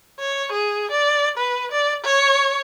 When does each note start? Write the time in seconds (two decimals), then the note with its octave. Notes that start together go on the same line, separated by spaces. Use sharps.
0.19 C#5
0.52 G#4
0.91 D5
1.37 B4
1.72 D5
2.04 C#5